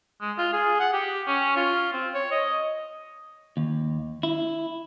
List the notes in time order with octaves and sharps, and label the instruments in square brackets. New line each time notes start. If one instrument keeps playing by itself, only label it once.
[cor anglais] G#3
F4
G#4
F#5
G4
C#4
F4
C4
C#5
D#5
[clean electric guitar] D#2
E4